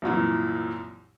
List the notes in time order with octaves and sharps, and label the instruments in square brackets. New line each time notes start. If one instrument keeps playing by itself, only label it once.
[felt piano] C2 F#2 A#2 E3